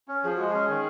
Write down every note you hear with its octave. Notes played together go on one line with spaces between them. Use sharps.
C#4
F3 G#4
G#3 F#4
G#4
C#4
D#3